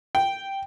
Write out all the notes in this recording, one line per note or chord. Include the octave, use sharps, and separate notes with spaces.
G5